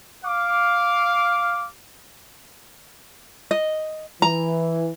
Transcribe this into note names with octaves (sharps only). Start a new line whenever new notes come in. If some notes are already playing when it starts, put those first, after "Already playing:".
F5 D6
D#5
E3 A#5